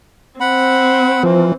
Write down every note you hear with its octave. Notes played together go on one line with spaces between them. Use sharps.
C4 F#5 B5
E3 F3